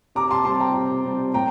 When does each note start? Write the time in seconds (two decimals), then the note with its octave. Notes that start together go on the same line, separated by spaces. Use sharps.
0.15 C3 A#5 D6
0.31 A5 C6
0.45 G3 C4 A5 C6
0.60 G5 A#5
0.75 C3
1.05 G3 C4
1.34 A2 G5 A#5